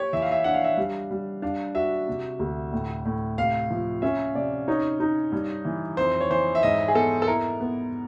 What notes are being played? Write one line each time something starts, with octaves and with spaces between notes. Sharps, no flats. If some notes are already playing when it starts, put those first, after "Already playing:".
Already playing: G4 C#5
E3 E5
F5
E5
D4 F#5
F5
E5
G3 F5
G3
D4 F5
F#4 E5
C3
D2
A2
A2
C3 F5
F3
C#4 E5
C3 D5
D#4 C#5
D#4
G2
E3
F2 C5
C#5
E3 C5
E5
G#2 D#5
G#4
B3 A4
A4
E4 A#4
B3